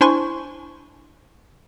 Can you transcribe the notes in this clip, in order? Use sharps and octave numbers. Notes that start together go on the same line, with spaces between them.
D4 E4 C5 G#5 C6 C#6